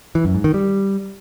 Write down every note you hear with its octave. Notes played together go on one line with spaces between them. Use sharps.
E3
F#2
G#2
D#3
G3